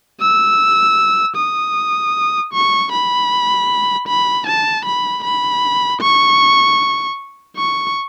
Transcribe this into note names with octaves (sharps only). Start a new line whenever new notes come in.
E6
D#6
C#6
B5
B5
A5
B5
B5
C#6
C#6